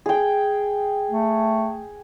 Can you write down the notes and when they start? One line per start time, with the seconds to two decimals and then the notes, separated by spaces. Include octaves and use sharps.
0.06 G#4 G5
1.11 A3